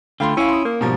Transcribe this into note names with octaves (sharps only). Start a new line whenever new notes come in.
D3 A3 F4 F5 G5 B5 C6
C#4 E4 F5 G#5 C#6
C6 D#6
A#3
G#2 B2 F3 G3